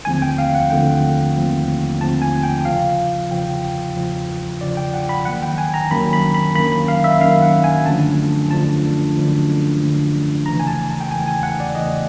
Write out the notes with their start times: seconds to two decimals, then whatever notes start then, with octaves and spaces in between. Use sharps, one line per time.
0.05 D#2 D3 F3 A3 C4 G#5
0.22 G5
0.38 F5
0.55 F#5
0.70 D#2 D3 F3 A3 C4 G5
1.36 D#2 D3 F3 A3 C4
2.01 D#2 D3 F3 A3 C4 A5
2.22 G#5
2.43 G5
2.65 E2 C#3 F3 F5
3.30 E2 C#3 F3 G5
3.96 E2 C#3 F3
4.60 E2 C#3 F3 D5
4.77 G5
4.94 F#5
5.09 B5
5.25 F#2 D#3 F#3 A#3 F#5
5.42 G5
5.58 G#5
5.74 A#5
5.90 F#2 D#3 F#3 A#3 B5
6.13 B5
6.34 B5
6.55 F#2 D#3 F#3 A#3 B5
6.72 B5
6.88 F5
7.04 E5
7.20 F#2 D#3 F#3 A#3 F5
7.42 F#5
7.64 G#5
7.85 F#2 D3 F3 A3 D4 A5
8.51 F#2 D3 F3 A3 D4 A5
9.16 F#2 D3 F3 A3 D4
9.81 F#2 D3 F3 A3 D4
10.45 E2 C#3 E3 A3 A#5
10.60 G#5
10.67 A5
10.89 A5
11.00 G5
11.10 E2 C#3 E3 A3 G#5
11.28 G#5
11.43 F#5
11.60 D5
11.75 E2 C#3 E3 A3 D#5